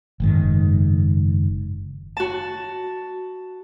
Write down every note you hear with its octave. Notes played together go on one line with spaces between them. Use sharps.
F#1 G#2 D#3
F#4 A5